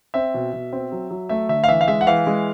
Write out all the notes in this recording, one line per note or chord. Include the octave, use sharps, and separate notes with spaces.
C4 E5
B2
B2
C4
F#3
F#3
A3 E5
D3 E5
F5
E3 E5
F5
G#3 E5
F#5
E3 F5
G#3